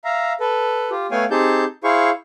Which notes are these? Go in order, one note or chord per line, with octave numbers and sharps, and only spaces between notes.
E5 F5 A#5
A4 B4
F4 G4
A3 B3 C#5 F5 G5 G#5
C4 D#4 G4 G#4 A5 G6
E4 G#4 C5 F5 C#6